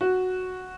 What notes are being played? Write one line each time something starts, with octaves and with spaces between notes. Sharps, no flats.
F#4